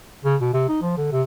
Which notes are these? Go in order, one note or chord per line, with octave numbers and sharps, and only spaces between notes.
C#3
B2
C3
D#4
F3
D3
C3